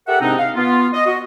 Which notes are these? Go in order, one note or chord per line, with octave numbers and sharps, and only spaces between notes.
G4 A4 A#4 E5 F#5
G#2 C3 C4 D4 D#4
F5
B3 F4
D#5
F#4 D#5